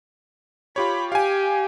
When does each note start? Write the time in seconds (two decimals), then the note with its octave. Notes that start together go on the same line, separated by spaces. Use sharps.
0.76 F4 G4 C#5 B5
1.12 G4 F5 G#5